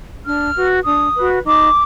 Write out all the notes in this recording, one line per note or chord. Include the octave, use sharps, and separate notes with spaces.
D4 F6
F#4 B4
D4 D#6
F#4 B4
D#4 D6